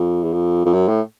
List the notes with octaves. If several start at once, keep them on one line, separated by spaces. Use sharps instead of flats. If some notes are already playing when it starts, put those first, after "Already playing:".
Already playing: F2
E2
F2
F2
F#2
A2